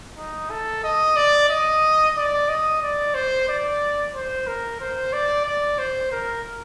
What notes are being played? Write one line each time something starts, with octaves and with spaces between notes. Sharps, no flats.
D#4
A4
D#5
D5
D#5
D5
D#5
D5
C5
D5
C5
A#4
C5
D5
D5
C5
A#4